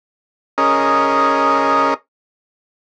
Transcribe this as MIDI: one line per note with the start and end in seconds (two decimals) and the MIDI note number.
0.58 1.94 61
0.58 1.94 68
0.58 1.94 70
0.58 1.94 75